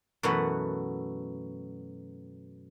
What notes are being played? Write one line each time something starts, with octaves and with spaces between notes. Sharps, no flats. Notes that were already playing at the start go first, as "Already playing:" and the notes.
F#2 B2 E3 A3 B4 F#5